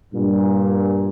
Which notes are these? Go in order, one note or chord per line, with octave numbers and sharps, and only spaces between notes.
G2 A#2